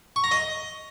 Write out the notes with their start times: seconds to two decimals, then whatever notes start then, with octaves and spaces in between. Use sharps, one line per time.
0.16 C#6
0.24 A#5
0.31 D#5